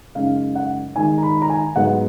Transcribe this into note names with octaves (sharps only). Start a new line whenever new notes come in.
F#2 C#3 G#3 D#4 F5
F#5
D#3 G#3 D#4 G#5
A#5
B5
A#5
G#5
G#2 F#3 B3 F#5